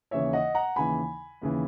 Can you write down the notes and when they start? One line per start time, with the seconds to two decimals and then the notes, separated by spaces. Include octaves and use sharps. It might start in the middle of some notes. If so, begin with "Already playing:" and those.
0.11 D#2 C#3 E3 C#5 E5
0.33 D#5 F#5
0.55 F#5 A#5
0.76 D#2 C#3 E3 G#5 B5
1.42 D#2 C#3 E3